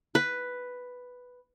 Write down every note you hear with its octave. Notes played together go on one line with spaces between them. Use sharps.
B4